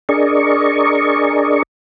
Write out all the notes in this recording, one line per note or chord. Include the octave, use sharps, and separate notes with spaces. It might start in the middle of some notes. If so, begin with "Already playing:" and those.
D4 G#4 A#4 D5 D#5 C#6